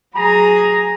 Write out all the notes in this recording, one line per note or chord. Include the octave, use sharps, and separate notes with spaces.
F#3 G#4 A#5